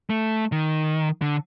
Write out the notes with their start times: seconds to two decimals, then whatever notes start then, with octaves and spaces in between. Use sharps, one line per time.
0.10 A3
0.52 D#3
1.22 D3